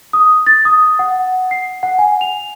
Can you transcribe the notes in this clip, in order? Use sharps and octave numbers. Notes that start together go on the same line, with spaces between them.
D#6
A6
D#6
F#5
C7
F#5
G#5
F7